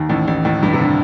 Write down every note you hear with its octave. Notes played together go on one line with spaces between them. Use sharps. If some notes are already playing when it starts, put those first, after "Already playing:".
Already playing: D#2 D#3
A1 A2
A1 A2
A1 A2
G2
C3
D3